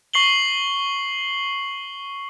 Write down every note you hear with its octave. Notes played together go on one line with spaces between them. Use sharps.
C#6 C7 F#7 G7